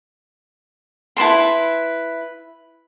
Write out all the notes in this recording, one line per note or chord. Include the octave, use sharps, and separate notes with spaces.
E4 B4 A5 C6